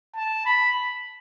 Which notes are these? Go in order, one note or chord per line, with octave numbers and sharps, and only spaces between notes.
A5
B5